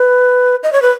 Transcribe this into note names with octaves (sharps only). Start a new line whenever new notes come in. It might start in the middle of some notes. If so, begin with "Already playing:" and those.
Already playing: B4
D#5
C#5
B4